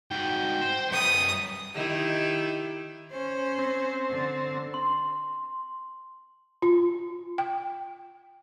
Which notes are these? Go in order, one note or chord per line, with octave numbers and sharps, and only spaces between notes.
G#2 F#4 G5
C5
F#2 B3 D#6
D#3 E4 G4
C#4 C5
C4
D3
C6
F4
G5